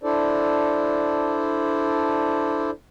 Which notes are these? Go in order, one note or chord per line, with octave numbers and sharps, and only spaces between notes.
D4 E4 A4 C5 D5